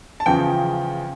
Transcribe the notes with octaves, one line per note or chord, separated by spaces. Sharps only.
A5
E2 C#3 F3 G5